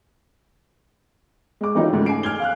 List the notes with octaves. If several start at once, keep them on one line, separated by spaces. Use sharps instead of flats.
G#3 D6
D#3 E3 F#3 C#4 D#4 F4
G#2 C#3 A3
G#5 C7 D7
F6 G#6 G7
F5 F6 F#6